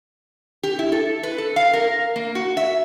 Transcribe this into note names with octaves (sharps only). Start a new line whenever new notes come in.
G4
E4
A4
B4
A4
F5
A#4
A#3
F#4
E5